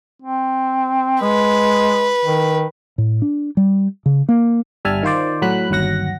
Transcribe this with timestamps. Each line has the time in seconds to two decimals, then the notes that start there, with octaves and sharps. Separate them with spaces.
0.22 C4
1.22 G#3 B4
2.25 D#3
2.98 A2
3.22 D4
3.57 G3
4.06 C#3
4.29 A#3
4.85 G1 G3 E5 G#5 A5 F6
5.03 D#3 F4 C5 D5
5.42 A2 F#3 B5 F#6
5.70 G1 D#2 F#3 F#5 A#6